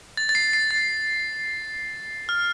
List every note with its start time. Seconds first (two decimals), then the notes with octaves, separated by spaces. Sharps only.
0.17 A6
0.29 A6
0.35 C7
0.53 C7
0.71 A6
2.29 F6